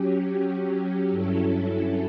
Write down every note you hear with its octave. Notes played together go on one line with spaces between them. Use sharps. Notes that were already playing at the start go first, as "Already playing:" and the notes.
Already playing: F#3 C#4 G4
G2 F#3 C#4 E4 A4